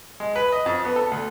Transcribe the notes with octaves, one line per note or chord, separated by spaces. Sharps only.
G#3
B4
D#5
F2
B3
A4
D2